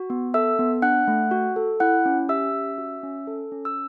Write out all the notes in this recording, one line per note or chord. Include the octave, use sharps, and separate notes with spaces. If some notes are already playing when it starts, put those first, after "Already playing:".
Already playing: F#4
B3
A4 E5 E6
B3
D4 F#5 F#6
A3
F#4
A4
E4 F#5 F#6
C#4
G4 E5 E6
C#4
F#4
C#4
A4
C#4
E6